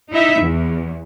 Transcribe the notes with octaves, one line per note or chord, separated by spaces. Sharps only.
D#4 E4 E5
E2